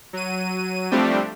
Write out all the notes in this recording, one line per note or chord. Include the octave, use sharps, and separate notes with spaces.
F#3 D#7
F3 G3 A3 C4 D4 G4